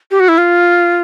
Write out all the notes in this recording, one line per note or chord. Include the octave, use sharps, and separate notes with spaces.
G4
F#4
E4
F4